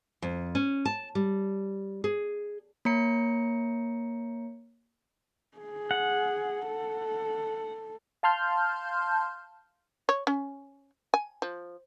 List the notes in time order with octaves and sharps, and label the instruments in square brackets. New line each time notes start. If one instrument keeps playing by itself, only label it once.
[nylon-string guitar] F2
C#4
A5
G3
G#4
[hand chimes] A#3 C#5 A#5 C#7
[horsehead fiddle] G#4
[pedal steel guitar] F#5
[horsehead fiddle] A4
[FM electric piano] F5 A5 C6 F6 G6
[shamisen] C#5
C#4
G#5
F3